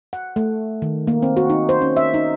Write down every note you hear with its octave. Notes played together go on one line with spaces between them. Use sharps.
F#5
A3
D#3
A#3
C4
F#4
D#4
C5
C#4
E5
D#4